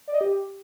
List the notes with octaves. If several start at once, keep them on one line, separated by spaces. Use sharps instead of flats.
D5
D#5
G4